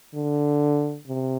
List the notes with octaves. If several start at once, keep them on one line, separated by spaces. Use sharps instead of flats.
D3
C3